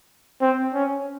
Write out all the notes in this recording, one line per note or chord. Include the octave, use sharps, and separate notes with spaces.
C4
C#4